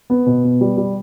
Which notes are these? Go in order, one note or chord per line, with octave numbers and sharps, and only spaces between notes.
B3
B2
B3
G3
G3